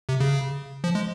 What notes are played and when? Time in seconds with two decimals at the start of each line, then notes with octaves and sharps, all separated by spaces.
0.09 C3
0.20 C#3
0.84 F3
0.95 G#3